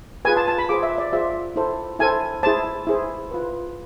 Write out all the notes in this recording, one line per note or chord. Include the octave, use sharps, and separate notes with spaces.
F4 G#4 B4 G#5
A5
A5
B5
F4 G#4 C5 D6
E5
D5
F4 G#4 C5 E5
E4 A4 C5
E4 A4 C5 G#5
E4 G#4 C5 A5
E4 G#4 C5
F4 B4